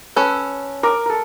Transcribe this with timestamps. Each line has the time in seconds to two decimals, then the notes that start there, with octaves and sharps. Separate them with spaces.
0.16 C#4 A4 B4
0.83 A#4 D6
1.06 A4 A#4